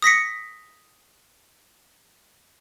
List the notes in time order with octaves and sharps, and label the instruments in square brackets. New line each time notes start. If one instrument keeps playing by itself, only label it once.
[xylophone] D#6 A#6 B6 C#7